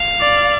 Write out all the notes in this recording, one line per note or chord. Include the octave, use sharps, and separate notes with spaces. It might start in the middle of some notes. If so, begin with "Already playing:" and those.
Already playing: F5
D5